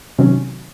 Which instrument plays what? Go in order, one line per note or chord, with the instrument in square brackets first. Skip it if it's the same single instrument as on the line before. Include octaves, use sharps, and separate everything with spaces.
[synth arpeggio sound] C3 D#3 F#3 [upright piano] C#4